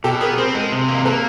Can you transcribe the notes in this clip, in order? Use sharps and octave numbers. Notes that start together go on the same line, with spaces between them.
B2 G4 A4
B3 G#4 A#4
C4 A#4 C5
G#3
C3
A#3
A#3 A4 B4